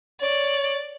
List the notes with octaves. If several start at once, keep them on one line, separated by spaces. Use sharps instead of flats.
C#5 D5